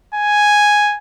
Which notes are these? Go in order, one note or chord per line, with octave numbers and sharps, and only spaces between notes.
G#5